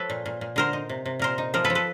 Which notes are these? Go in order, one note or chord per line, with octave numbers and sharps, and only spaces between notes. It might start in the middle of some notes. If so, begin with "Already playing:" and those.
Already playing: F3 A4 B4 C#5
A#2
A#2
A#2
D3 A#4 C5
D#4
C3
C3
A#2 A#4 C5
D#4
F3 A#4 C5
A4 B4
F3
A4 B4